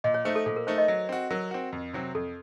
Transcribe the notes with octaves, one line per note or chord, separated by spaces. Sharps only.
A#2 D#5
C#5
A3 D#4 C5
A4
A#2 A4
A#4
A3 D#4 C5
D#5
F#3
C4 F#4
F#3 A#4
C4 F#4
F2
C3 F#3 C4
F2 A4